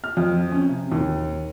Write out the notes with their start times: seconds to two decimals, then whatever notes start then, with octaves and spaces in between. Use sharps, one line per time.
0.04 F6
0.17 F2
0.52 C#4
0.69 C3
0.92 D#2